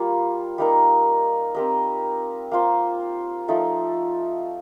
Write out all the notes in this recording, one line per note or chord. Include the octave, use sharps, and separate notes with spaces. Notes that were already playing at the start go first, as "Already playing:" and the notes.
Already playing: G3 A#3 F4
G3 A#3 D#4 A#4
C4 G4 A#4 D#5
A#3 F4 C5
F3 A3 D#4 A4